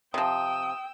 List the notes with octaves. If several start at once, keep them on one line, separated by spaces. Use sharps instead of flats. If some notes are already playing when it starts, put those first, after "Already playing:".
C3 F3 G5 D#6 E6